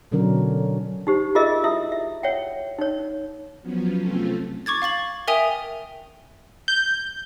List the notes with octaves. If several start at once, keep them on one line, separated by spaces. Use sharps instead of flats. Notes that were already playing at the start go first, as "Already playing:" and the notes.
B2 D3 F#3 C#4 D4 A#4
D#4 G4 C5
F4 G#4 A#4 D#5 E5
E4 E5 D#6
E5
C#5 E5 F#5 G5
D#4 C#5
F3 F#3 B3 C#4
C3 A3 C4 C#4 F4 A4
C#6 D6 G#6 A6
F5 C#6 A6 F#7
A#4 E5 G5 G#5 D#6 F7
G6